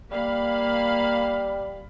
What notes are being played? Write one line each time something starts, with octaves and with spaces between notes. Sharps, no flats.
G3 A#3 F5 B5